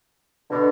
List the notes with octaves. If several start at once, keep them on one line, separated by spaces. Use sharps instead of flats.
B2 D3